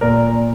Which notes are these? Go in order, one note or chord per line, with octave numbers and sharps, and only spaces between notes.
A#2 A#4 D5